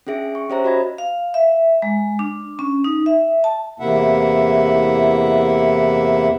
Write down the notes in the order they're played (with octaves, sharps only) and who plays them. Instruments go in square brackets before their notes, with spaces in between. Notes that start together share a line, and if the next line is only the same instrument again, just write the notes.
[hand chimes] C#4 D4 G#4 E5 D7
C#6
C#4 G4 C5 C#5 E5 A#5
F#4 C5 D#5 B5 G#6 A#6
[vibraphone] F5
E5
G#3
D4
C#4
D#4
E5
A5
[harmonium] E2 C3 A#3 E4 E5 F#5